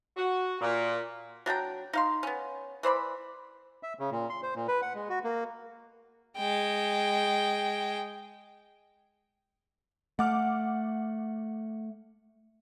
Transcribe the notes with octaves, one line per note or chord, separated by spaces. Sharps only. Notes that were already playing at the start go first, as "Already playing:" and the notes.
F#4
A#2
F#3 D4 G5 A#5
D#4 F5 C6
B3 C#4
E3 C5 D5 B5
E5
C#3
A#2
C6
C5
A#2
B4
F#5
G#3
F#4
A#3
G#3 G5
A3 F#5 D6 F6